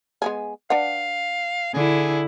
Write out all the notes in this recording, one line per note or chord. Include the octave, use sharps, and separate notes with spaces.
G#3 B3 G#4
D4 B4 F5 F#5
D3 E4 G#4